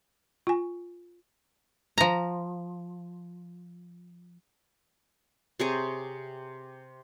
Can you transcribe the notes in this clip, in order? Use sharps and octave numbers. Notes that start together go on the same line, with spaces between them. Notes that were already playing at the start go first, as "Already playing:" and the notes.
F4 G#5
F3 A#5
C3 G#4 C#5